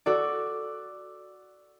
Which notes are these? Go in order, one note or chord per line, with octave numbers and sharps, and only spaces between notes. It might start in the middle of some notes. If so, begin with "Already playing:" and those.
F#4 A4 D5